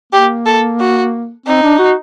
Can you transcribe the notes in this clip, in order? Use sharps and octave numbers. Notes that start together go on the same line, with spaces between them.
A#3 G4
A4
F#4
C4 D#4
D4
F#4